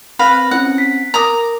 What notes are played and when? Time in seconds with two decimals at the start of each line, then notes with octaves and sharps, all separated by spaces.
0.19 C4 B4 F5 B5 F#6 A#6
0.51 C4 C#4 E4 F#5
0.78 B6
1.14 A#4 A#5 D6 D#6